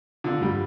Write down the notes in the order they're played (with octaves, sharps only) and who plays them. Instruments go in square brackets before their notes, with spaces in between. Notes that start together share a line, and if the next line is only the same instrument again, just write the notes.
[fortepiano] D3 [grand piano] F4
[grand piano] G2 [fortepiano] G3